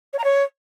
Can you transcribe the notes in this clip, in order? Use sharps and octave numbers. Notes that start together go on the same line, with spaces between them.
C#5
A#5
C#5